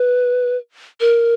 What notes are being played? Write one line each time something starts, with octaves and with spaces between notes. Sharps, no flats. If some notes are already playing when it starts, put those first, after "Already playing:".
Already playing: B4
A#4